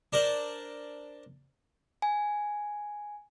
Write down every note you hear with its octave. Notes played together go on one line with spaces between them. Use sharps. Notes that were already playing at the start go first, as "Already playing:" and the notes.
D4 A#4 C5 D5
G#5